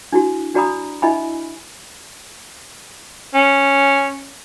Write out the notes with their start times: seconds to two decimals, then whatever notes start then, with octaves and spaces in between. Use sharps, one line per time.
0.12 D4 E4 F#4
0.54 D4 F#4 D5 A#5 B5 D#6
1.02 D4 E4 D#5 E5 G#5 B5
3.35 C#4